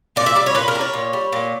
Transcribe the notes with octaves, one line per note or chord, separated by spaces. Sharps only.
A#2 D5
E5
G3 D5
C#5
A#2 B4
A#4
G3
C#5
A#2
G3
A#2